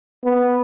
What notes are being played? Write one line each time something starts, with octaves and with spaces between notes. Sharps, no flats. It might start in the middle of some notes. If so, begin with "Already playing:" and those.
B3